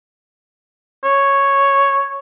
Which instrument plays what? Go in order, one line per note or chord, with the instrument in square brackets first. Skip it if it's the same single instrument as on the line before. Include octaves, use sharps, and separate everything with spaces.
[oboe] C#5